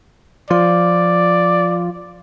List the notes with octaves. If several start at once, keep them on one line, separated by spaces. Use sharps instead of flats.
F3 F4 D5